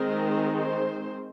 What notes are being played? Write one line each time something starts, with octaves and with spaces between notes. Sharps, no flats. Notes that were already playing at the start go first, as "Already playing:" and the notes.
Already playing: D#3 G#3 C4 A#4
C5